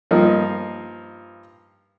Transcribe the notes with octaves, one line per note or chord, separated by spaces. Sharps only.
G2 F3 A#3 D#4